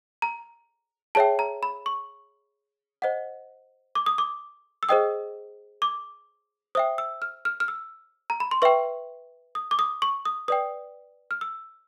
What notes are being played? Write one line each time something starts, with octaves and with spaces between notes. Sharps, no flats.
A#5
G#4 C#5 E5 G5 A5
A#5
B5
C#6
C5 D#5 F#5
D6
D#6
D6
E6
G#4 C5 D#5 G5 D#6
D6
C5 E5 G5 D#6
E6
F6
F6
F6
E6
A#5
B5
C6
B4 E5 G5 C#6
D#6
D6
D#6
C#6
D#6
B4 D5 G5 D#6
F6
E6